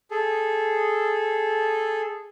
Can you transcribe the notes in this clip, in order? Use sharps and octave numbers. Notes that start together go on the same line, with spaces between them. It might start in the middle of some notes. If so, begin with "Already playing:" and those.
G#4 A4